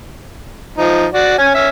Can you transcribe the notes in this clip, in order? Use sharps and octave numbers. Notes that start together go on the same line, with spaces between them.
F3 D#4
F#4 D5
C#4 G#5
C#4 E5